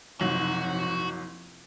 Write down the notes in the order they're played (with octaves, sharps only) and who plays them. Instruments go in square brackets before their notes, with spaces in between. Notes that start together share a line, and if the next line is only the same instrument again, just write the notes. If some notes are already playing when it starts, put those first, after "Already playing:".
[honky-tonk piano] F#1 G#2 F#3 [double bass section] C3 F3 [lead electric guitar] F#4